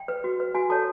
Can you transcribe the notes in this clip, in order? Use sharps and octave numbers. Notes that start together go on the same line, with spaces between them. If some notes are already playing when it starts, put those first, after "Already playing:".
Already playing: G5
B4
F#4
B4
F#4 G#5
A4 C#5 A5